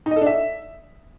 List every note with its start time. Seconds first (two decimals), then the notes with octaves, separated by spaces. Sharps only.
0.06 D#4
0.11 D#5
0.16 A4
0.21 D4
0.26 E5